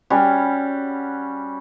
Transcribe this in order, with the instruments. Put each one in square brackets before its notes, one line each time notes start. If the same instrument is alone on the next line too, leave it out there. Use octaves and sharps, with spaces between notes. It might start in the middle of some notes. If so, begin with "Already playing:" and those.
[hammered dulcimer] G3 C#4 F#4